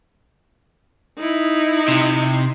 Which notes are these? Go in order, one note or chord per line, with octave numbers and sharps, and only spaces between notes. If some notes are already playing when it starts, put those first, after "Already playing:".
D#4 E4
C3